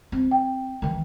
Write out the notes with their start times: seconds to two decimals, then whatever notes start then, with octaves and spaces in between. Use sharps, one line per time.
0.12 C4
0.31 G5
0.82 D#3 E3